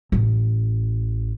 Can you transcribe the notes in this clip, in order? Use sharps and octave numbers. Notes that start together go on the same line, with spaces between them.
A1